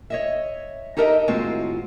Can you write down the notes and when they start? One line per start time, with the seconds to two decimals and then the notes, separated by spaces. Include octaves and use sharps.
0.10 C#5 D#5 E5
0.97 D#4 G4 A4 A#4 D#5 E5
1.28 D#2 A2 G#3 C4 F4 F#4